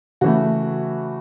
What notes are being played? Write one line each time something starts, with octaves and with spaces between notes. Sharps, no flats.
C#3 E3 A3 F#4